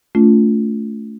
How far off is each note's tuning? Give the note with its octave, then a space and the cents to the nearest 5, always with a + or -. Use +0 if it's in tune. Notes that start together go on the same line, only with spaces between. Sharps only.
A3 +0 C#4 +45 F4 +0